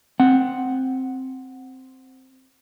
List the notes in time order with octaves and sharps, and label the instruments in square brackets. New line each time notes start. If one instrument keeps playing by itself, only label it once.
[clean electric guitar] C4 F#5